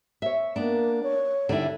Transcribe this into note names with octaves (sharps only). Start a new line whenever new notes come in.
C#5 E5
A#3 B3 D4
C#5
D3 G3 E4